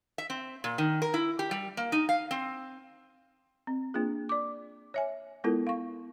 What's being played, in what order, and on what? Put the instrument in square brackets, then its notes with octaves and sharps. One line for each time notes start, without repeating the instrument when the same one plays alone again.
[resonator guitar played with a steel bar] E5
C4
A#2
D#3
A#4
E4
G4
G3
A#3
D#4
F5
C4
[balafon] C4
A#3 D4 F4 G#4
D5 D6
C#5 E5 G#5
G#3 B3 E4 F4 A4 A#4
F5 C#6